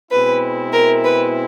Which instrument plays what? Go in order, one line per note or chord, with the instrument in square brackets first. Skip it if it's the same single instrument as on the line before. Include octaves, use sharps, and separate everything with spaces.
[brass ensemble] B2 G#3 C4 E4 [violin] B4
[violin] A#4
B4